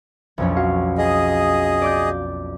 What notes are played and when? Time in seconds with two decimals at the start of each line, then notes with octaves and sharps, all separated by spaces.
0.38 B1 F2 C#4
0.57 F#4 F5
0.98 G#4 D#5
1.82 D5 D6 G6